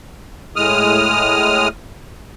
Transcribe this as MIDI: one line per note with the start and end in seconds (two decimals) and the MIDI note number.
0.56 1.68 45
0.56 1.68 56
0.56 1.68 87
0.56 1.68 89